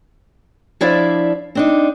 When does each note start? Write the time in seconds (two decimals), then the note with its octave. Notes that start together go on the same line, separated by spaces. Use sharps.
0.81 F3 D4 E4 D5 E5 F5
1.55 C4 D4 D#4